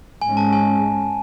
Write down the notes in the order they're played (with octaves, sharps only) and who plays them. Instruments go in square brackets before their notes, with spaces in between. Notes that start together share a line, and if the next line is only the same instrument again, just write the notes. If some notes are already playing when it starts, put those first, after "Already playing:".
[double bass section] G#2 G#3 C#4 [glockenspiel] G#5
[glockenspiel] A5
G#5